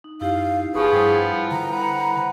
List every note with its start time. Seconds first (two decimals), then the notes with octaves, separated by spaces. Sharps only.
0.04 D#4
0.21 F#2 D#4 E4 G4 F5
0.74 G1 F3 B3 G#4 A5 C#6 D#6
0.92 G2 G3 E4 C5
1.51 D3 A#5
1.71 B4 F#5